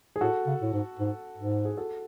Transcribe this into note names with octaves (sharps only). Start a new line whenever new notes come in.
G#4
A2 F#4 A4
C#3
A2
G#2
G#2
G#2
G#4
F#4 A4